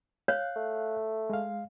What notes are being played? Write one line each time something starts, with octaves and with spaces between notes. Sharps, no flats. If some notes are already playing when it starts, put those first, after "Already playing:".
C#5 F5 F#6
A3
G#3 F5